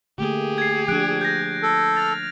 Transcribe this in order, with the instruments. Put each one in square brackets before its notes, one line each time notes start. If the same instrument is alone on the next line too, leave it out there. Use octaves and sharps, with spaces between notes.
[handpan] D3 A3 A#3 [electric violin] G4 G#4
[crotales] G#6 C7
[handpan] F3 D4 [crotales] F#6 D7
[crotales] G6 G#6 A#6
[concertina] A4
[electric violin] F6 [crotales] A6